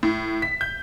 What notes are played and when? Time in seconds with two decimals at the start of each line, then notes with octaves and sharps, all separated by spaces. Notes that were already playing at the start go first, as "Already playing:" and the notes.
0.03 A2
0.42 B6
0.61 G6